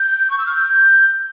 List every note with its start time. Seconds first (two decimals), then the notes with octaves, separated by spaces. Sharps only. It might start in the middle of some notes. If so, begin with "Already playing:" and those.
Already playing: G6
0.30 C#6
0.39 E6
0.46 F6
0.55 G6